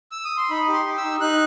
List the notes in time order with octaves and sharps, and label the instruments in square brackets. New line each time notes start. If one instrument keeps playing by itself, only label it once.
[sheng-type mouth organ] E6
D#6
C6
D#4 B5
G4
C6
G4
E6
D#4
D#4 F#6